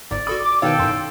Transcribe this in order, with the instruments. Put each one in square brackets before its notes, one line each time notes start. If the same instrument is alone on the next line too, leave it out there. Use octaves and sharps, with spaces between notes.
[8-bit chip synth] G1 G#2 [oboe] D5
[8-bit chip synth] F#4 A4 B5 [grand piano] D#6
[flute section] D6
[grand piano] B2 D#3 F5 [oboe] A4 [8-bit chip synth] B4 C#5 [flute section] G5
[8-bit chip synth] F#2 A2 [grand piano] C6